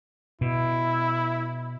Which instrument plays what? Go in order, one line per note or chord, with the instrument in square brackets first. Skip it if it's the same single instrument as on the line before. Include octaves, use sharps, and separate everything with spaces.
[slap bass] B2 [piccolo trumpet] E4